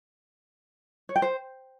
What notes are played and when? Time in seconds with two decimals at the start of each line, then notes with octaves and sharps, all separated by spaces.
1.09 C#5
1.16 G5
1.22 C5